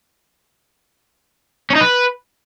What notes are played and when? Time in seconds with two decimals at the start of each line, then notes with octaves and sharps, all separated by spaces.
1.70 C#4
1.75 D#4
1.81 B4